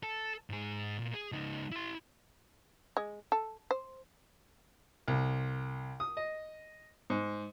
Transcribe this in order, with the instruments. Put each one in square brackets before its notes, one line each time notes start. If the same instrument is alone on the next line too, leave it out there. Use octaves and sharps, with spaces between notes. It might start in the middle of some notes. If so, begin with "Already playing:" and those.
[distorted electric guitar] A4
G#2 G#4
A#2
G#4
C#2 D#4
E4 C6
[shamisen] G#3
A4
C5
[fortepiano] C2
D#6
D#5
G#2